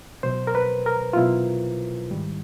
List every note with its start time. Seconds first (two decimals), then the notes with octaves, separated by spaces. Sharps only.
0.23 B2 F#3 C5
0.47 A#4
0.55 B4
0.86 A#4
1.13 F4
1.16 B2 F#3 E4
2.10 G#2 D#3 G3